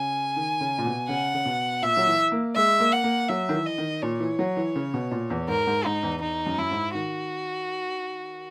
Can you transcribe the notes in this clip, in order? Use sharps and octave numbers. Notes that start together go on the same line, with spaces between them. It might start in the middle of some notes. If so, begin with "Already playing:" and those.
Already playing: C#3 G#5
D#3
C#3
A#2
B2
C#3 F#5
C#3
B2
A#2 E5
F#3
E3
A#3
G#3 E5
A#3
F#5
A#3
F#3 E5
D#3
E3
D#5
D#3
A#2 C#5
E3
F#3
E3
C#3
B2
A#2
E2
G#2 A#4
G#2
G#2 D#4
E2
E2 D#4
F#2
F#2 E4
G#2
D#3 F#4